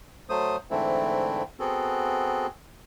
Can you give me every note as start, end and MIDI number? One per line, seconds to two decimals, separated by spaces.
0.29 0.56 54
0.29 0.56 57
0.29 0.56 72
0.29 0.56 87
0.71 1.43 44
0.71 1.43 50
0.71 1.43 52
0.71 1.43 57
0.71 1.43 60
0.71 1.43 64
1.60 2.47 59
1.60 2.47 60
1.60 2.47 66
1.60 2.47 68
1.60 2.47 69